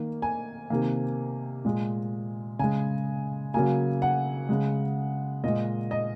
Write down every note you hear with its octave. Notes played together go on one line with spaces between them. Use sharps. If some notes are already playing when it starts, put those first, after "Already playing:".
Already playing: D#3 A#3
G#5
C3 D#3 A#3
A#2 G#3
C#3 G#3 G#5
C#3 F#3 A#3 G#5
F#5
C#3 G#3
A#2 G#3 D#5
D#5